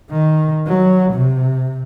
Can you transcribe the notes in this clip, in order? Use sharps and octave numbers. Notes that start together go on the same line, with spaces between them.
D#3
F#3
C3